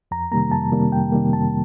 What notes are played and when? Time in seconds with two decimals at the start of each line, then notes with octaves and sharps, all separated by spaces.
0.11 F2 A#5
0.31 C3 D#3 G3 A#3 A#5
0.52 F2 A5
0.72 C3 D#3 G3 A#3
0.92 F2 G5
1.12 C3 D#3 G3 A#3
1.33 F2 A5